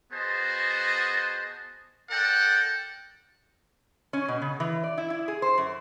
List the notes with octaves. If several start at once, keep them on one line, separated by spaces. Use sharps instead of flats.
B3 F#4 G#4 C5 D#5 A5
A4 A#4 D5 F#5 G5
C#4
B2
C#3
E3
D5
E4
E4
G#4
C5
F#2